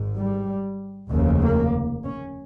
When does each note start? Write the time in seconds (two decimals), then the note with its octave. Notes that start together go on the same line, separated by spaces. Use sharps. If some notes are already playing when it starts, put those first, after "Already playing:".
Already playing: G#1 G#2
0.15 G3
1.10 F1 D#2 C#3
1.41 A#3
2.04 C#4